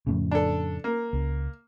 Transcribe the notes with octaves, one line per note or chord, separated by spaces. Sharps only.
F2 A2 C#3
D4 A4
A#3
C#2